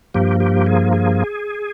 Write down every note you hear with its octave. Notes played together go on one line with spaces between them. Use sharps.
G2 F3 A#3 G4
G4
G#4
G#4